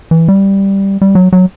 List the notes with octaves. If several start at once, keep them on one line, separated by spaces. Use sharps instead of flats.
E3
G3
G3
F#3
F#3